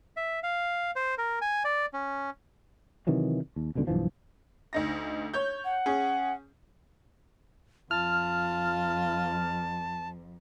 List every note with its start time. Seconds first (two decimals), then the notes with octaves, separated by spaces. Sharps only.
0.17 E5
0.43 F5
0.96 C5
1.18 A#4
1.41 G#5
1.65 D5
1.93 C#4
3.07 C3 D#3 E3 F#3
3.56 D#2
3.75 D#1 C#2 B2 D3
3.87 B1 G2 E3 F3
4.73 D2 D#4 A#6
5.34 C#5 G6
5.65 F#5
5.86 C#4 G#4
7.91 F2 F4 A5 F6